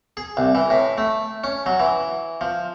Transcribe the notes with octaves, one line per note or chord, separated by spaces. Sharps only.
G#4
C2
E3
A2
A3
C#4
F#3
E3
F3